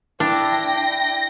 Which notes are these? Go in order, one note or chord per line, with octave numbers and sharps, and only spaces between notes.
D4 E4 G5 A#6